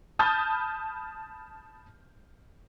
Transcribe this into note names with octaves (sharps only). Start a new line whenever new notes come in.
A5 B5 D#6 F6 G6 A6